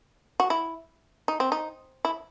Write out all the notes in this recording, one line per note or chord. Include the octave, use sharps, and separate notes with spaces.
F#4
E4
D#4
C4
D#4
E4